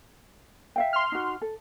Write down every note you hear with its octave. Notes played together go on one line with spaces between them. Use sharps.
E5 F5 G5
C6 F6
D#4 F#4
A4